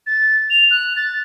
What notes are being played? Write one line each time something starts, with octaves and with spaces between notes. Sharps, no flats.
A6
F7
F#6
A6